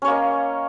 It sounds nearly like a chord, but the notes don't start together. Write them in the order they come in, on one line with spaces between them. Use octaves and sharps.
C#4 C#5 A#3 D#5